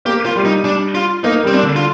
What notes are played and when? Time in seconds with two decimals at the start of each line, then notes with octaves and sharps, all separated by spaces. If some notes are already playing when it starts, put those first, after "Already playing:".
0.05 A#3 G4
0.26 F4
0.36 G3
0.45 D#4
0.65 D4
0.95 F4
1.24 A#3 D#4
1.44 G3 C4
1.54 D4
1.63 D3
1.76 F4